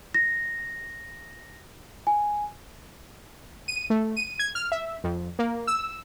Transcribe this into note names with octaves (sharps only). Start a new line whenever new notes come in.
A#6
G#5
D#7
A3
D#7
G#6
F6
E5
F2
A#3
E6